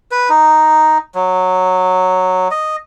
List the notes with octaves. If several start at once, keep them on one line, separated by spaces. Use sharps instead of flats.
B4
D#4
F#3
D#5